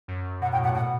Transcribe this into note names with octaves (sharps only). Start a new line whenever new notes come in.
F#2
B2 F#5
A2 G5
A#2 F#5
B2 F#5